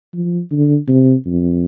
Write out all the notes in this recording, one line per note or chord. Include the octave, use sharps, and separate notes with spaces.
F3
D3
C3
F2